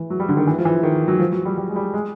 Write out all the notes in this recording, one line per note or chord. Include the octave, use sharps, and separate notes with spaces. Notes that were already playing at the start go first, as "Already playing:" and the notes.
Already playing: E3
F#3
G3
D3
D#3
E3
F3
E3
D#3
F#3
F3
F#3
G3
G3
G#3
G3
G#3